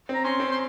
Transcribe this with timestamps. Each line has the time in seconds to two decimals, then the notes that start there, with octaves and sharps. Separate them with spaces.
0.09 C4
0.14 A#5
0.24 C#4 C6
0.40 C4
0.51 C6